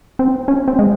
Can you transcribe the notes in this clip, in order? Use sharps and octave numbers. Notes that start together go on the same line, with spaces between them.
C4
C#4
C4
G#3